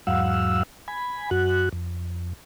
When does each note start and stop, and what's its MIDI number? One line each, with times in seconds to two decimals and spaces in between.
0.07 0.63 40
0.07 0.63 44
0.07 0.63 54
0.07 0.63 77
0.07 0.63 78
0.07 0.63 88
0.88 1.30 80
0.88 1.30 83
1.31 1.69 42
1.31 1.69 66
1.31 1.69 90
1.73 2.33 41